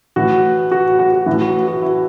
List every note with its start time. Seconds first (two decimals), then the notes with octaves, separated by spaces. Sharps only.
0.16 A2 E3 F#4
0.71 F#4
0.99 F#4
1.13 F#4
1.26 A2 E3 E4
1.41 F#4
1.68 F#4
1.82 E4